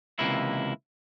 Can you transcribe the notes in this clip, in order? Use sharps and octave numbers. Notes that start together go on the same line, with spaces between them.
C#2 C3 E3 A#3 E4